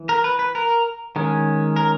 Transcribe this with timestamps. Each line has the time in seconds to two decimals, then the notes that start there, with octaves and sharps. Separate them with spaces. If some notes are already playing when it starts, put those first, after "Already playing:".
Already playing: E3
0.09 A#4
0.24 B4
0.39 B4
0.55 A#4
1.16 D#3 G#3 C#4
1.76 A#4